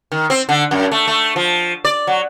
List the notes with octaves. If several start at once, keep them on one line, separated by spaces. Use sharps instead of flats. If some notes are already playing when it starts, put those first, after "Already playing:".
D#3
C4
D3
F#2
A3
A3
F3
D5
F#3